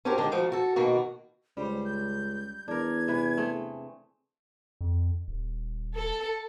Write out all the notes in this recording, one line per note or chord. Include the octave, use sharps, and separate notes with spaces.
C#4 D4 F#4 G4 A#4 C5
D3 D#3 G#3 D4 G4
D#3 F3 A3 F#4
F#4 A4
B2 D#3 A#3 F#4
C#2 G3 C5
G6
E2 D4 A#4 G#6
C3 E3 B4
A3 C4 G#4
F2
D#1
A4